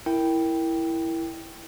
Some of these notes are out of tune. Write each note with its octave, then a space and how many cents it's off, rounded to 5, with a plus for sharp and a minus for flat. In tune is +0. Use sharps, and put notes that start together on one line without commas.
E4 +0 A#4 +0 G5 +0